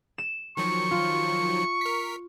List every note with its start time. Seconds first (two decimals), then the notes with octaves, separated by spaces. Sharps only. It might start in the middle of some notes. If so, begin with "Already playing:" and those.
0.18 E7
0.57 D#3 F3 F#3 C#6
0.91 F4
1.81 A#4 B6